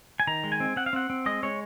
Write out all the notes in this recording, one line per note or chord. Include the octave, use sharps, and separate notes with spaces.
G#5
D#3 A#5
G#3
G#5
C4
C4 F#5
F5
C4 F#5
C4
G#3 D#5
G#3 C#5